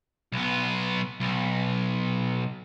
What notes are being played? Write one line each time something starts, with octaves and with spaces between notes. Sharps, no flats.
B1 B3
B1